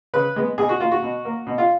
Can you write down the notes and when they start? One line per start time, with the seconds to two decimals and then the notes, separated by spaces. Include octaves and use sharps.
0.14 C#3 B4
0.36 G#3 B3
0.58 B2 G#4
0.69 F#4
0.80 A#3 F4
0.91 F#4
1.02 B2
1.25 A#3
1.47 B2
1.58 F4